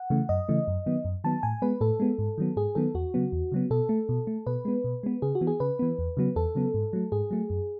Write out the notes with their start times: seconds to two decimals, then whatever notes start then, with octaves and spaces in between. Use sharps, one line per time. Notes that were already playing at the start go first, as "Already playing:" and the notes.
Already playing: F#5
0.10 C#3 E3 A3
0.29 F#2 D#5
0.49 C#3 E3 A3
0.68 F#2
0.86 D#3 F#3 B3
1.05 F#2
1.24 D#3 F#3 B3 A5
1.43 A2 G#5
1.62 G#3 B3 B4
1.81 A2 A4
2.00 G#3 B3
2.19 G#2
2.38 D#3 F#3 B3
2.56 G#2 G#4
2.75 D#3 F#3 B3 A4
2.94 E2 F#4
3.14 C#3 F#3 B3
3.32 E2
3.52 C#3 F#3 B3
3.70 B2 A4
3.89 A3
4.09 B2
4.27 A3
4.47 B2 B4
4.65 G#3 B3
4.84 B2
5.03 G#3 B3
5.22 C#3 G#4
5.35 F#4
5.41 E3 B3
5.47 G#4
5.60 C#3 B4
5.79 E3 B3
5.98 E2
6.17 C#3 F#3 B3
6.36 E2 A4
6.55 C#3 F#3 B3
6.74 G#2
6.93 F#3 A3
7.12 G#2 G#4
7.31 F#3 A3
7.50 F#2